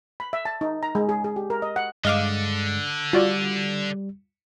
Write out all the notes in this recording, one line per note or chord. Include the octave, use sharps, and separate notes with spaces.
B5
E5
A5
D#4
A#5
G#3
G#4
G#4
G4
A#4
D#5
F#5
G2 D3 G#3 D#5 F5 D6
G3 F4 F#4 D5